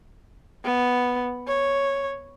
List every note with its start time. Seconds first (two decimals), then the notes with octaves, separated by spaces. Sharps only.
0.65 B3
1.47 C#5